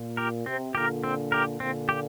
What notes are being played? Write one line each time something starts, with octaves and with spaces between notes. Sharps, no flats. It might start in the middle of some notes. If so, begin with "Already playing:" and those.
Already playing: A#2
G4 A#4
C3 C4
A#2 D3 G4 A#4
C4
G4 A#4
A#2 D3 C4
G4